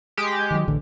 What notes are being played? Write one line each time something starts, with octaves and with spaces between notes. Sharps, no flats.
G#3 G4
D#3 F#3
A1 D3